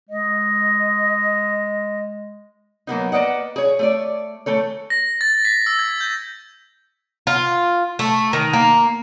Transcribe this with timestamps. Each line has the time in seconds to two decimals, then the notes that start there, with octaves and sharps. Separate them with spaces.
0.09 G#3 D#5
2.87 F#3 A#3 B3 D#4
3.12 A#3 B4 D5 D#5 F#5
3.56 G#4 C#5
3.79 A3 C#5 D5
4.46 E3 A3 A4 C#5
4.90 A#6
5.21 A6
5.45 B6
5.66 E6
5.79 G#6
6.01 G6
7.27 F4
7.99 A3
8.33 D#3
8.53 A#3